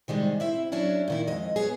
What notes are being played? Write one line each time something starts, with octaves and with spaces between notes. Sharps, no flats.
C3 D#3 G3 G#3
C4 E4 E5
F#3 C#4 D4 E4
A#2 D#3 E4
F2 D#3 G#3 D#5
B3 C#4 G#4